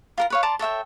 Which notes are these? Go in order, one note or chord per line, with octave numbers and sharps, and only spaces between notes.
F4 A#4 A#5
B4 C#5 F5
D5 A5 A#5 C6
A4 C#5 E5 G5